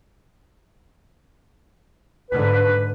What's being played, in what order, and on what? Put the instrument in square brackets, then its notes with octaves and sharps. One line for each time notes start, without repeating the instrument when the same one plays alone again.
[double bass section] G#2 D3 [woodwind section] B4